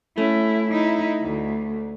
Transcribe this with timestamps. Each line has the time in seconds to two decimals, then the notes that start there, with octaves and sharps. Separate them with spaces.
0.18 A3 C#4 E4
0.71 D#4 E4
1.22 D2